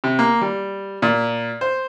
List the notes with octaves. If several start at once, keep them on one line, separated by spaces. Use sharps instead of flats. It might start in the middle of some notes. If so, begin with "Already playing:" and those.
C3
A#3
G3
A#2
C5